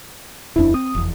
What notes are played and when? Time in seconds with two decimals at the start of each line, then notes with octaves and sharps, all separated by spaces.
0.56 D#1 F2 D4 E4
0.74 C4 D#6
0.95 F1 E2